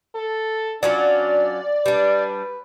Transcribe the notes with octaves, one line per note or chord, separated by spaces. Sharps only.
A4
F#3 C#4 D4 F4 D5
G3 D4 B4